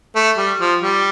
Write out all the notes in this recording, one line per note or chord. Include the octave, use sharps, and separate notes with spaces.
A3
G3
F3
G3